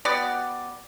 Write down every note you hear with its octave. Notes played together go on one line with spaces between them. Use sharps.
B3 F#4 G4 D5